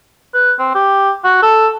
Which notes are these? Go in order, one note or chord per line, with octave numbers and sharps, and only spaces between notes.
B4
C4
G4
F#4
A4